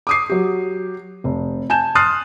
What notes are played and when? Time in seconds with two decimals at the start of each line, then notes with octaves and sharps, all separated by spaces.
0.07 D6 D#6 C7
0.30 F#3 G4
1.24 F1
1.70 G#5 A5 G6 E7
1.95 C6 D#6 F6 F#6 A6 C7